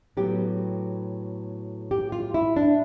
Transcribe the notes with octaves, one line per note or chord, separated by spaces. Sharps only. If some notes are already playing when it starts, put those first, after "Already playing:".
A2 F#3 B3 G4
G4
F4
E4
D4